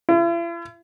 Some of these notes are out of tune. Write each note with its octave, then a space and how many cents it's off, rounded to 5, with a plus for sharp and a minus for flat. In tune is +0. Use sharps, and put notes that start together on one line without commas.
E4 +45